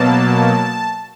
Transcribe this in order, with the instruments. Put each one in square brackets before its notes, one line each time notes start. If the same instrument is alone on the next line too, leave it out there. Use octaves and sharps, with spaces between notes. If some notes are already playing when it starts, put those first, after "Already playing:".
Already playing: [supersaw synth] B2 F#3 A#3 A5